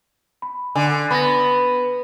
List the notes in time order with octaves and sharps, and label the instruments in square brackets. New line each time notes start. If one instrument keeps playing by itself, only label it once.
[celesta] B5
[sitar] D3 [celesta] G#5
[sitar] B3 [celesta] B5 A#6